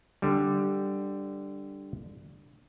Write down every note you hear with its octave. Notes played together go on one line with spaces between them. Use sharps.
D3 G3